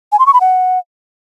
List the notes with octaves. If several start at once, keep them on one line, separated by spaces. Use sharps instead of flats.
G#5
C6
C#6
B5
F#5